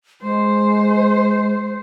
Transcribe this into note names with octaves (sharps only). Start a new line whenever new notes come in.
G#3 C5